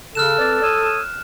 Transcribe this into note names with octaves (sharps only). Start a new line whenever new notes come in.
C#3 A4 F6 F#6 E7
C4 B4 D5
C#5 D#6 E6